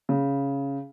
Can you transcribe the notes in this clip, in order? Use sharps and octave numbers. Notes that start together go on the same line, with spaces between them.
C#3